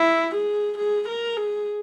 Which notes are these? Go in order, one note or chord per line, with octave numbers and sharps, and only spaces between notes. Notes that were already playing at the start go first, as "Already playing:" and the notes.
Already playing: E4
G#4
G#4
A#4
G#4